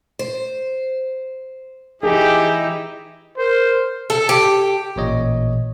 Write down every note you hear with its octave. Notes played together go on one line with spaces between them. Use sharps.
C5
E3 D#4 E4 G4 G#4
A#4 C5
A4
G4
A1 A#2 C#5 D#5